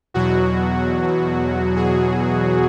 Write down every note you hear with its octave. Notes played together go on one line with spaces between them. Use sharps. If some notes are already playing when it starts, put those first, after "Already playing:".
E2 B2 F#3 F#4
G#4